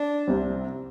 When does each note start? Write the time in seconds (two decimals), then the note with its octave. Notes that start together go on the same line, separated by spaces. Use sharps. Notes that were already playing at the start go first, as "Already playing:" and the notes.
Already playing: D4
0.27 C2 C3 G3 C4